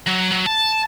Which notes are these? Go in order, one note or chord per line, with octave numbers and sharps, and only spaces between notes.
F#3
F#3
A5